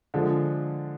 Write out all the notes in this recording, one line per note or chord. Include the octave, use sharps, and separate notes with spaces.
D3 F3 G#3